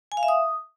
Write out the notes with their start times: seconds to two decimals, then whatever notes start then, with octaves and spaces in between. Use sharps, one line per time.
0.12 G#5
0.17 F5
0.23 E5
0.28 D#6